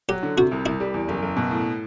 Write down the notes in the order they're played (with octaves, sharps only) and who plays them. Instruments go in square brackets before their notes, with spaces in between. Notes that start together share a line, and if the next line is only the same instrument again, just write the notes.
[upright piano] F#3 [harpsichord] G4
[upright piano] D3
[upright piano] C3 [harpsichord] F#4
[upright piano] C2
[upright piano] C2 [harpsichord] E4
[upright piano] G3
E2
F#1
F#1
B2
A2